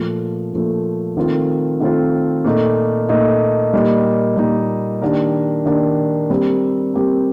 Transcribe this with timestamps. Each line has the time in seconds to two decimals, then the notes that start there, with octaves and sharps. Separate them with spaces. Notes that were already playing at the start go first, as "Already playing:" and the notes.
Already playing: A#2 F3 A3
0.52 A#2 F3 A3
1.17 D#3 A3 C4 F4
1.80 D#3 A3 C4 F4
2.44 A#2 A3 D#4
3.09 A#2 A3 D#4
3.73 A#2 G3 A#3 D#4
4.37 A#2 G3 A#3 D#4
5.02 D#3 A#3 D4 G4 A#4
5.66 D#3 A#3 D4 G4 A#4
6.29 G3 C4 G4 A#4
6.94 G3 C4 G4 A#4